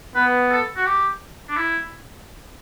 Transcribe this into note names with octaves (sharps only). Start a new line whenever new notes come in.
B3 B4
A4
F#4
G4
D4
E4